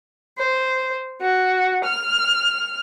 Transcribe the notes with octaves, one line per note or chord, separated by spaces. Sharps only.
C5
F#4
F6